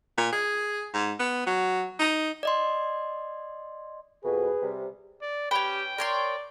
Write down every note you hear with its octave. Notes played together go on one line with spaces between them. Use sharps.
A#2
G#4
G#2
B3
F#3
D#4
D5 D#5 C6
F2 B2 G#4 B4
C3 G3
D5
C#4 G4 B4 G5
A#4 C#5 D5 C6